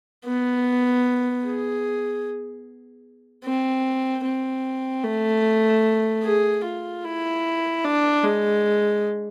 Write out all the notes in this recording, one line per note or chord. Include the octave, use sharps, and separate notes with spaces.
B3
G#4
C4
C4
A3
G#4
F4
E4
D4
G#3